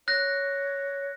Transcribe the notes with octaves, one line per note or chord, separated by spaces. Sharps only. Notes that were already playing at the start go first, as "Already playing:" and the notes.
C#5 F#6 A#6